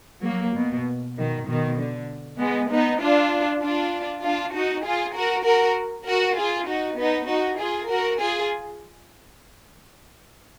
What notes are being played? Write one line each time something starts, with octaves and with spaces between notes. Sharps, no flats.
F#3 A#3
B2
B2 D#3
B2 D#3
D3
G#3 B3
B3 D#4
D4 F4
D4 F4
D4 F4
D#4 F#4
F4 G#4
F#4 A#4
F#4 A#4
F#4 A#4
F4 G#4
D#4 F#4
B3 D#4
D#4 F#4
F4 G#4
F#4 A#4
F4 G#4